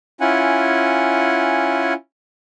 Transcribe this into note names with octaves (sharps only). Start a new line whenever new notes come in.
C#4 E4 F4 F#5 G#5